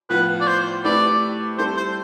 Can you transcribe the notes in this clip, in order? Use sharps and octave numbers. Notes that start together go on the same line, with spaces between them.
A2 F3 B3 F4 B4
D5
C5
A3 C4 E4 G4 B4 D5
G3 C4 E4 A4 C5
C5